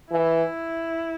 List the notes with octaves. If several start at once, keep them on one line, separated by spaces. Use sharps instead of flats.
E3 E4